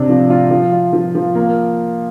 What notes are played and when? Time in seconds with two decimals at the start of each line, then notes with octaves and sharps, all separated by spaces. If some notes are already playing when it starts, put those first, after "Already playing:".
Already playing: C3 D4
0.09 F3
0.30 F4
0.51 F3
0.72 F4
0.93 F3
1.15 F3
1.35 A#3